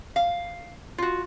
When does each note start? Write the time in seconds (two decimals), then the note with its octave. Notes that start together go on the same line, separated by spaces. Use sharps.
0.16 F5
0.98 F4 F#4